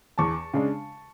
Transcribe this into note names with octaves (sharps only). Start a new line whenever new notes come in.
E2 A5 C#6
C#3 G#3 D4